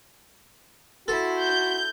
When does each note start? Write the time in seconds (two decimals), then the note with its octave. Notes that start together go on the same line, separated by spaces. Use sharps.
1.08 E4 F#4 A4 C6
1.43 G6